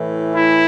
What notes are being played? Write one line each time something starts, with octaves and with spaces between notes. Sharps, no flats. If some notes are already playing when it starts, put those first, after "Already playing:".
Already playing: A2 E3
E4